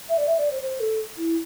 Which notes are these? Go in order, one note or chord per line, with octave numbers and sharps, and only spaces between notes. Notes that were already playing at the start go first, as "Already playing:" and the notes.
E5
D5
E5
D5
C5
C5
A4
E4